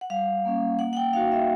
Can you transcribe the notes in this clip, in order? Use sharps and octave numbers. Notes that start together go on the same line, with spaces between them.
F#5
G3 F5
A#3 C#4
A#3 F#5
F#5
G5
D#4 F#4 F5
E5